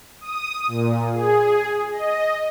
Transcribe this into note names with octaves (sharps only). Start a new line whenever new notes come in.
D#6
A#2
G#4
D#5